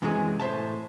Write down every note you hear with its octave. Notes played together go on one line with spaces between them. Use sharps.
F#2 C3 E3 F#3 G#3 G#4
A2 C5 E5 A5